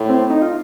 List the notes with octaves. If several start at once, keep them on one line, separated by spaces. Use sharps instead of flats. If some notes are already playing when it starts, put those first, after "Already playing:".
Already playing: A2
C4
D#4
F4